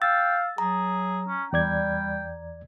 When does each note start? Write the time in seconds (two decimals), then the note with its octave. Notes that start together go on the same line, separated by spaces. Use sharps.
0.02 F5 G5 E6 A6
0.58 F#3 G#4 A#5
1.28 C#4
1.53 E2 G3 D5 G5 G#6